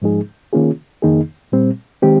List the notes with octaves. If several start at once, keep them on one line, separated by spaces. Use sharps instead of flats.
G#2 F3 G#3 D#4 G#4
D#3 A#3 C#4 F4 G#4
F2 D#3 A#3 D#4 G#4
A#2 G3 C4
D#3 G#3 C4 G4